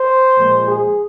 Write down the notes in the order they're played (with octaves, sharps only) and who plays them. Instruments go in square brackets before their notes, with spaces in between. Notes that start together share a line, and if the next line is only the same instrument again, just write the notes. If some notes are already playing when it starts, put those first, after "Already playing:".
Already playing: [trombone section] C5
A#2 F3 G#3
G#4